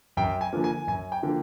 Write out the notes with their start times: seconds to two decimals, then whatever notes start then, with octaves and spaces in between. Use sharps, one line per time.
0.17 F#2 G5
0.41 G#5
0.53 D3 F3 A#3
0.64 G#5
0.87 F#2 G#5
1.12 G5
1.23 D3 F3 A#3